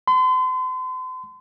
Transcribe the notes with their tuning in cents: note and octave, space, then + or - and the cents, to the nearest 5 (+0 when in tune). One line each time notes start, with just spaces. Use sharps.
C6 -40